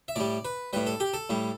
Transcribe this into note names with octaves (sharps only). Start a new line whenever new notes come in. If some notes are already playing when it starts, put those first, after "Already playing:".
E5
A2 G3 D5
B4
A2 G3 B4
A4
G4
A4
A2 G3